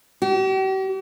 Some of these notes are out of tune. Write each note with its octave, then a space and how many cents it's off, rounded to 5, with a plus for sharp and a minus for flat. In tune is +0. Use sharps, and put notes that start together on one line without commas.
G4 -45